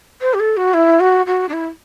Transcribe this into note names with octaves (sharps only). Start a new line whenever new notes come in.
C5
G4
A4
F#4
E4
F#4
F#4
D4
E4